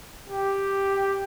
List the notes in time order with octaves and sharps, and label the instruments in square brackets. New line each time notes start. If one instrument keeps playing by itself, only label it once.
[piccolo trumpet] G4